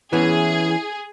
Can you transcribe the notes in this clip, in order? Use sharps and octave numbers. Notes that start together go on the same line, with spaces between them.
E3 B3 C#4 E4 G#4